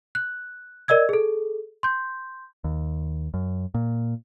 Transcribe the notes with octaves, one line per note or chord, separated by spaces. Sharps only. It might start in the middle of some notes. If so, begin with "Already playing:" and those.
F#6
A#4 D5 D#5 E6 G#6
G#4 A4
C6 G6
D#2
F#2
A#2